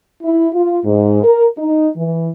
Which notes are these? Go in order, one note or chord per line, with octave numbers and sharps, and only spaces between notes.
E4
F4
G#2
A#4
D#4
E3